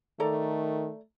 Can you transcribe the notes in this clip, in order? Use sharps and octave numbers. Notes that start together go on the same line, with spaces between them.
D#3 A3 A4 D5 A#5